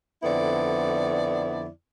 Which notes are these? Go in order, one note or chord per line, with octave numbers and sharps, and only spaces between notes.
F2 D3 B3 E4 D5